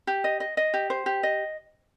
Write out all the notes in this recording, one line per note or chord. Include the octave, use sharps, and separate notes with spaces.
G4
D#5
D#5
D#5
G4
C5
G4
D#5